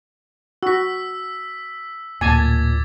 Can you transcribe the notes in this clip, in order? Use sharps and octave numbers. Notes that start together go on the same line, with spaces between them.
F#4 E6 B6
D1 A#2 G#5 A5 D6 G#6 A6